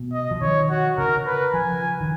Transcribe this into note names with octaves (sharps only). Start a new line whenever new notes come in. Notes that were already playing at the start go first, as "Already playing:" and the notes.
Already playing: B2
D#5
F3
D#3 C#5
F#4
C#3 A#4
B4
F3 G#5
D#3